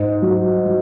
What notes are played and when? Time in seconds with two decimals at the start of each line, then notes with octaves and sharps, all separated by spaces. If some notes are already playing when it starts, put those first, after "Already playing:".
Already playing: G#2
0.22 F#3
0.65 F#3